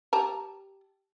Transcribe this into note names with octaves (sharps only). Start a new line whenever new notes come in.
G4 A5 A#5